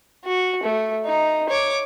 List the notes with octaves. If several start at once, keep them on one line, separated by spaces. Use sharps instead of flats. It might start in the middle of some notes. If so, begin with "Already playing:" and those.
F#4
A3
D#4
C#5 D6